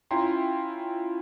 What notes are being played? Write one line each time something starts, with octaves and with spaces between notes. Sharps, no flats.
C#4 E4 F4 G5 A#5 C6